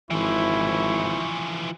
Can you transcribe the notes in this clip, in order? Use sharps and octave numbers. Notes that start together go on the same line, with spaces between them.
G#1 E3 F3 E4 C#6